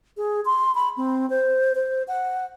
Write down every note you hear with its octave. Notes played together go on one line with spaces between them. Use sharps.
G#4
C6
B5
C4
C5
C5
F#5